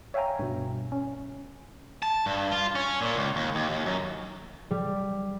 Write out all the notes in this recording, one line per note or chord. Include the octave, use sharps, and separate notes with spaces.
C#5 E5 F5 G5 G#5 A#5
G2 B2
C#4
A5
G2
F4
C#4
A#2
C#2
D#2
D#2
D#2
F#2
G3